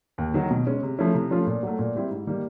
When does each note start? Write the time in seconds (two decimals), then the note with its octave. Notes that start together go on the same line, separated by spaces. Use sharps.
0.18 D#2
0.34 D#3 F#3
0.51 B2
0.67 G#3 C#4
0.83 C3
0.99 F3 A3 C#4 E4
1.15 C3
1.31 F3 A3 C#4 F4
1.47 A#2
1.63 F#3 A3
1.79 A#2
1.95 G3 C4 E4 G4
2.11 G#2
2.27 D#3 G3 A#3